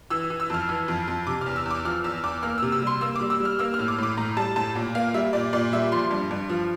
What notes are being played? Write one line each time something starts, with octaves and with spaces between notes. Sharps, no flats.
E3 E6
E3
E6
F2 F6
E3
F2
F2
C3 D6
E2 F6
E6
E2 D6
F3 F6
E2 E6
E2 D6
A#3 F6
C3 E6
E6
G3 C6
A#3 E6
D6
G3
E6
G3
F6
A#3 E6
F6
A2
D6
A2 D6
A2 A#5
G3 A5
A2 A5
A#2
A#3 F5
G3 E5
A#2 D5
A#2 D5
G3 E5
F3 C6
G2
G2
F3